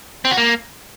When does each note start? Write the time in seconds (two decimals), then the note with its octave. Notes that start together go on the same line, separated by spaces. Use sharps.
0.25 C4
0.31 F#4
0.37 A#3